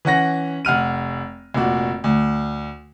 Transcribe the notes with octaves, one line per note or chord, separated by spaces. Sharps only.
E3 C#4 F#5 A#6
F1 F#5 F6 D#7
F1 A#2 F#4
D2